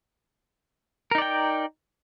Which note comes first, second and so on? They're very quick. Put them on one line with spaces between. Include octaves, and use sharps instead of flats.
A#4 D#4 D5 G5